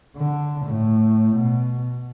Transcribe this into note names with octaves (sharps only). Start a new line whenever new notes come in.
D3
A2
B2